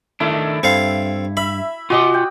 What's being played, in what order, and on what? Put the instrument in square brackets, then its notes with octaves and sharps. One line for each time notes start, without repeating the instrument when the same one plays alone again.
[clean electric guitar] D#3 A3 D4 [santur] E4
[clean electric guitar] G2 [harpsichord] C4 A4 F5
[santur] E5 [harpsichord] B5
[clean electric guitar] F4 G#5 C6 [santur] F#4 D#5 D6
[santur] G5